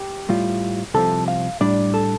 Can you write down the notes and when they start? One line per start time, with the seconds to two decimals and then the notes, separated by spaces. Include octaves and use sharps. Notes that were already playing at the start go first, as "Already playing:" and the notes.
Already playing: G4
0.29 A2 G3 F4
0.94 C2 C3 F3 A4
1.28 F5
1.61 A2 G3 D4 D5
1.94 A4